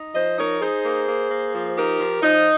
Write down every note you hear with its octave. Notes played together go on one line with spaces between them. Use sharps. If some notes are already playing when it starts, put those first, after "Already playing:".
Already playing: D#4
F3 C5 D#5
D#4 A#4 C#5
D#4 G#4 C5
A#3
A#3
A#3
F3
D#4 G4 A#4
F3
F3 D#4